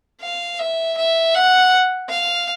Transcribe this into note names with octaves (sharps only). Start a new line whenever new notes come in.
F5
E5
E5
F#5
F5